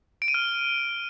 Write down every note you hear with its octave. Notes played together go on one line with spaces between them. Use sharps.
D7
D#7
F6